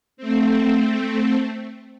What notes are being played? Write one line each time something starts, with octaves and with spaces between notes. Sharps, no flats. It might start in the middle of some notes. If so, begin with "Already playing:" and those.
A3 C4